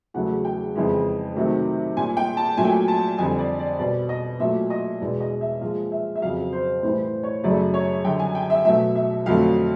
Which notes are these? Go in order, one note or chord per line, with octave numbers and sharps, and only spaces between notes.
E2 C#3 F#3 A3 F#5
G5
F2 C#3 E3 G#3
C3 D#3 F#3 A3
A#2 G3 G#5
G5
A5
A#2 F#3 A3 G#5
G5
G#5
A5
F2 D3 G3 G#5
D5
D5
B2 G3 D5
D#5
A#2 F#3 A3 E5
D#5
E2 B2 G#3 D5
D#5
E5
A#2 F3 G#3 F5
E5
E5
F2 C#3 F#3 F5
C5
A2 E3 G3 C5
C5
C#5
F#2 C#3 F#3 A3 D5
C#5
F#2 D3 G3 G5
G#5
G5
E5
B2 F#3 A3 E5
E5
F2 D3 F#3 A3 F5